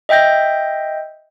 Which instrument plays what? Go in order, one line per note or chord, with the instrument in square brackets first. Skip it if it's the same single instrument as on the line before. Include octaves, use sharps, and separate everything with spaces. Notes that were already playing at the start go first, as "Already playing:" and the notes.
[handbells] D#5 E5 G5 G6 A#6